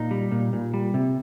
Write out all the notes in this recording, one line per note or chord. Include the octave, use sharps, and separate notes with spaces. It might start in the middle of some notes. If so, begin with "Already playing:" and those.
Already playing: A#2 D#4
G3
A#2
A#2
G3
C3